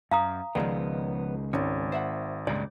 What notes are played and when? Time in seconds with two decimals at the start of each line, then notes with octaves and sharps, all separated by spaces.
0.11 F#2 F5 A#5 D#6
0.55 C#2 D#3 F3 G#3 B3 D5
1.53 G#1 C#3 C#4
1.92 C5 E5 F#5
2.47 C#2 G2 A#2 C#5 D5